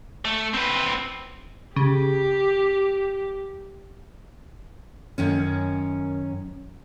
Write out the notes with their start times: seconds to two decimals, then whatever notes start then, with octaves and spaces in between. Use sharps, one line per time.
0.25 A3
0.54 C4 B4
1.76 C#3 G4
5.18 F#2 D#3 C#4